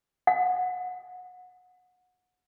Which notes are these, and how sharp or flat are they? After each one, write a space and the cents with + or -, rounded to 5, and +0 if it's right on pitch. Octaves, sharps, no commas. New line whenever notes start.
F#5 -25